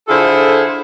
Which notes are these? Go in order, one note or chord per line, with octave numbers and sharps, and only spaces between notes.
D3 E4 F4 G#4 A4 C5